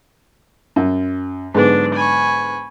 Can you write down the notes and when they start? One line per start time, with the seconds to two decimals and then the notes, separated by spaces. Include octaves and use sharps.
0.76 F#2
1.54 G#2 D3 F#3 B3 D4
1.94 G#5 B5 C#6